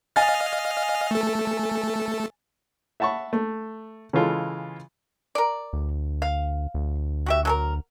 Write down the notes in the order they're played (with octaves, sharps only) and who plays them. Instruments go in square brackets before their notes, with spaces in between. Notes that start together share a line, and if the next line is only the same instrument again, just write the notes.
[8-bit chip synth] D#5 F5 F6 [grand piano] G#5 A6
[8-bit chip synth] A3 A4
[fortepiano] E5 F#5 A5 B5 C#6
A3
C#3 E3 G#3 F4 A4
[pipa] A#4 D5
[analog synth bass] D2
[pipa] F5
[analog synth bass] D2
[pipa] F#4 G4 E5
F#3 A4 A#4